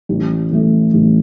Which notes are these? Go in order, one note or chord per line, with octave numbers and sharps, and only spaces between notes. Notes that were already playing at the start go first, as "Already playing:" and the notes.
A1
A2 E3 A3
A1